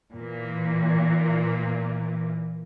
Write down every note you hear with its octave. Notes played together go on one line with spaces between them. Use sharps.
A#2 E3